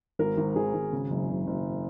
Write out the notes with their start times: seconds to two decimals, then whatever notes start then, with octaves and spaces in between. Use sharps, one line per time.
0.19 G#1 A#4
0.37 G#1
0.56 G#1 G#4
0.74 G#1
0.92 C#3
1.10 F#1
1.29 F#1
1.47 F#1